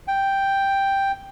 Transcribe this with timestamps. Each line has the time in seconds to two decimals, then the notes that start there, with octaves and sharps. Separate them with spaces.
0.08 G5